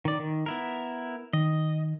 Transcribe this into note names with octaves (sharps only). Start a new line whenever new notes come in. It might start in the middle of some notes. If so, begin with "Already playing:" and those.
D#3 D5
D#3
B3 E4 A#4
D#3 D#5